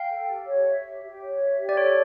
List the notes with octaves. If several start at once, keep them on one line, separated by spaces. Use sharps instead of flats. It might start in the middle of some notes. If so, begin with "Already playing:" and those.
Already playing: F5 G5
A4
G4
C#5
E5
G4
G4
C#5
E5
G4
D5
A4 C#5